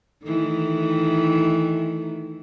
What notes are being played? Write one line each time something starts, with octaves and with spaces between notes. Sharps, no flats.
D#3 E3 A3